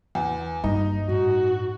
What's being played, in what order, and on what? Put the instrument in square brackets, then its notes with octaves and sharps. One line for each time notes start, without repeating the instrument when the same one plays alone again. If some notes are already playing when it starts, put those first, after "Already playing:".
[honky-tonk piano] E2
[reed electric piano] G2 [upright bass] G3 A#3 [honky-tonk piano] D#4
[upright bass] A2 [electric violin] F#4